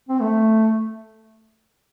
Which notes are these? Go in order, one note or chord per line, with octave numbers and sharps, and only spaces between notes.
C4
A3